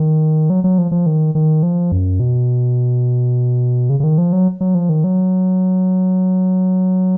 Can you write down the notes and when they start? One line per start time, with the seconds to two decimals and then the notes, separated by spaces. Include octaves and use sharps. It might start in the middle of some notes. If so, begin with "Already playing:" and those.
Already playing: D#3
0.50 F#3
0.64 F#3
0.78 F3
0.91 F3
1.06 D#3
1.35 D#3
1.63 F3
1.92 F#2
2.20 B2
3.90 C#3
4.00 C#3
4.04 D#3
4.18 F3
4.33 F#3
4.61 F#3
4.75 F3
4.89 D#3
5.04 F#3